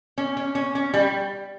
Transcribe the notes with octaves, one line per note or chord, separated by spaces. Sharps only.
C#4
C#4
C#4
C#4
G3